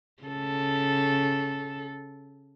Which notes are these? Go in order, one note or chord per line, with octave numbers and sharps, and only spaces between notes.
C#3 A4